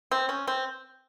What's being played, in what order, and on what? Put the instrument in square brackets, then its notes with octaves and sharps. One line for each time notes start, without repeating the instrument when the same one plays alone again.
[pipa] C4
C#4
C4